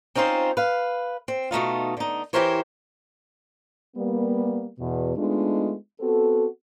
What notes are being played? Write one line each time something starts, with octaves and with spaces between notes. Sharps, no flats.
C4 C#4 D#4 F4 C5
B4 F5
C4
B2 A3 D#4 F4
D3 D#4
E3 E4 G4 A#4 C5 C#5
G3 A#3 B3
E2 B2
G#3 A3 B3 D4 D#4 F4
B3 C4 F#4 A4